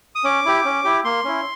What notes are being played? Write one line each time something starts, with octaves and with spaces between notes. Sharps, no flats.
D#6
C#4 D6
E4 G4
C#4
E4 G4
A#3 C6
C#4 E4